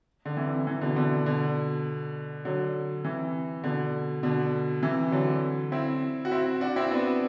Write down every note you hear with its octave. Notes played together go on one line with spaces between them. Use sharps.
D3
C3 E3
C3 E3
B2 D3
B2 D3
B2 D3
D3 F#3
C3 E3
B2 D3
B2 D3
C3 E3
D3 F#3
C4 E4
F#4
C4 E4
D4 F#4
C4 E4
B3 D4